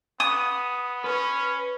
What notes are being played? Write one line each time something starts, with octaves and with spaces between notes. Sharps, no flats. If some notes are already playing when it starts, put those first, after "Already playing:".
B3 D#6
C#4 B4